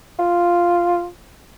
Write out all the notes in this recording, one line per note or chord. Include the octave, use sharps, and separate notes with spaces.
F4